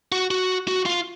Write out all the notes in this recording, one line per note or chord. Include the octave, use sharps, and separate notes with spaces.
F#4
F#4
F#4
F4